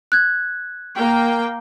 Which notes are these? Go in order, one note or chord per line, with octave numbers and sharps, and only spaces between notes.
F#6 G#6
A#3 G5